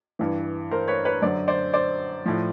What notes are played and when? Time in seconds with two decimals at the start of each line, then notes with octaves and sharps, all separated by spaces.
0.19 G2 E3
0.71 A#4 C5
0.88 B4 C#5
1.05 B4 C#5
1.22 F#2 D3 F#3 C5 D5
1.48 C5 D5
1.73 C5 D5
2.26 A2 F3